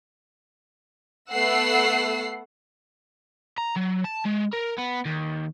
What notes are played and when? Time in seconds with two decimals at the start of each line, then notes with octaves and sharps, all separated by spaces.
1.31 A3 B3 F#5 E6 C7
3.58 A#5
3.76 F#3
4.04 A5
4.25 G#3
4.53 A#4
4.78 B3
5.05 D#2